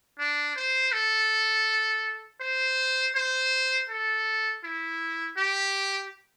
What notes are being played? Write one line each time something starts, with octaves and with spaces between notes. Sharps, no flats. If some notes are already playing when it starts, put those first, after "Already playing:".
D4
C5
A4
C5
C5
A4
E4
G4